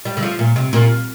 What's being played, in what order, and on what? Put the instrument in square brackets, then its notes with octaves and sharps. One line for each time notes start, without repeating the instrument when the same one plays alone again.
[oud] G3
D3
F3
A#2
C3
A#2